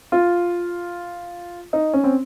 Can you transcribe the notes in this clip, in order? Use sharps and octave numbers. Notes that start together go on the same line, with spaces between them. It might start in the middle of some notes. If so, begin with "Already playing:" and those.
F4
D#4
C#4
C4